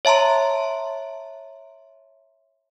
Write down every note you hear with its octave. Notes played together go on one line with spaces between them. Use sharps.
C#5 E5 A5 A#5 C6